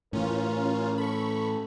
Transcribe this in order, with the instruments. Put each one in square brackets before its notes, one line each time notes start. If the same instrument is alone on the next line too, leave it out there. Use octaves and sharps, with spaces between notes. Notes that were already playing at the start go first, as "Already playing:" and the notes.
[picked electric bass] A2 E3 [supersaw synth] C#4 F4 [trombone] A#4
[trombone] A4 [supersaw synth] B5 C#6